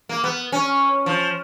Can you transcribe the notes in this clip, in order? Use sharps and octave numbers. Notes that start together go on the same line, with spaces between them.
A#3
B3
C#4
F3